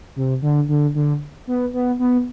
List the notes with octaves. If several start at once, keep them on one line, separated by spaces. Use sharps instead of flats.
C3
D3
D3
D3
B3
B3
B3